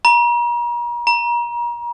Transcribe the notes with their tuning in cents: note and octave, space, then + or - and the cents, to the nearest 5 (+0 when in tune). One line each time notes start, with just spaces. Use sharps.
A#5 +40
A#5 +35